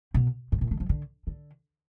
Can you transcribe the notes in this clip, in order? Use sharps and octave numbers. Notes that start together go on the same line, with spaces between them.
B2
G#2
A#2
D3
F3
D3
D3